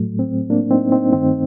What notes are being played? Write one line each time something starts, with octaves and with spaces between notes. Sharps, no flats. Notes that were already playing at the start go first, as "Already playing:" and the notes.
Already playing: A2 F#3 A3
C4
A#3 D4
C4 D#4
C4 D#4
G2 D#3 A3 C4 D#4